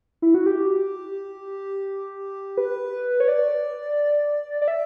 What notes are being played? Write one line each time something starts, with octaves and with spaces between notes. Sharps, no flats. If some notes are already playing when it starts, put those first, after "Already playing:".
E4
F#4
G4
B4
C#5
D5
D5
E5